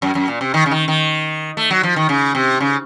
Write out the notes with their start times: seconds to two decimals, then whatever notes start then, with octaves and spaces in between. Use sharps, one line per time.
0.02 F#2
0.15 F#2
0.28 A#2
0.41 C3
0.54 D#3
0.66 C#3
0.71 D#3
0.88 D#3
1.57 A3
1.70 F#3
1.83 F3
1.96 D#3
2.09 C#3
2.35 C3
2.60 C#3